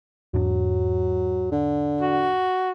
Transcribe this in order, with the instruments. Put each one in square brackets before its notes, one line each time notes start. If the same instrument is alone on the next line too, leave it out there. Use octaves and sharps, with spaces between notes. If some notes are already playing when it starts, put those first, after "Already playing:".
[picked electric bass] E2 G#2 D4 [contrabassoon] F#3
[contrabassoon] D3
[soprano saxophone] F#4